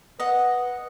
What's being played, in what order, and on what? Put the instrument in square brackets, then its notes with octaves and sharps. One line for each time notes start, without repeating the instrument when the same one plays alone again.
[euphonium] B4 [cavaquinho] D#5 F#5